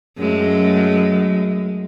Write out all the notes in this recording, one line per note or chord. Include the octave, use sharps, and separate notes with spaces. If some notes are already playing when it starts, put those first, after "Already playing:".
F#2 G#3 A3